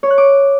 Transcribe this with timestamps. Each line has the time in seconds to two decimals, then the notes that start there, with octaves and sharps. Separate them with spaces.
0.03 C#5
0.10 F#6
0.18 D6